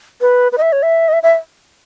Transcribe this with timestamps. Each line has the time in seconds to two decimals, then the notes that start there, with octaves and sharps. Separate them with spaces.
0.21 B4
0.52 B4
0.58 D#5
0.62 E5
0.72 C#5
0.83 E5
1.08 D#5
1.13 E5
1.23 E5